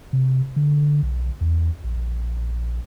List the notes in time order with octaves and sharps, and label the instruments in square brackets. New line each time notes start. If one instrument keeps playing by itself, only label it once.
[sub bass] C3
D3
B1
E2
A#1